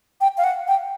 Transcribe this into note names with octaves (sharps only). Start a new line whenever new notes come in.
G5
F5
F#5
G5